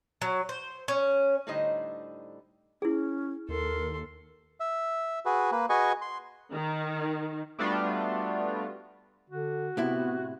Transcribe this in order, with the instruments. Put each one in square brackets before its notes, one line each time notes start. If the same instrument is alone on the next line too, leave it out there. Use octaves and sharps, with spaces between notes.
[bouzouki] F#3
C5
C#4
[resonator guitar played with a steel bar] A2 D3 G3 D#4 C5 D#5
[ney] C#4 [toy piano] E4 G#4
[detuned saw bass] D#2 [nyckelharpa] A4 C6 [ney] A#4
[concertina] E5
F#4 G#4 B4
A#3 B4
F#4 G#4 B4 D#5 G#5 C#6
C6
[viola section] D#3
[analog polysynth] G3 A3 B3 D4 F4 F#4
[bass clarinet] D3 [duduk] F#4
[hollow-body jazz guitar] A2 C3 E4 [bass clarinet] B3